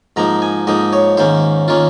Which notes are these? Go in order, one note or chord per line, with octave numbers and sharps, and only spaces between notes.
G#2 F3 A#3 D#4 A#5
G#5
G#2 F3 A#3 D#4 D#5
C#5
G#2 D#3 A#3 C#4 C5
D#3 A#3 C#4 F4